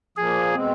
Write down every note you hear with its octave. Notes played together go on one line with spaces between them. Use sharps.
A#2 F3 A#3 G#4
B2 G#3 C4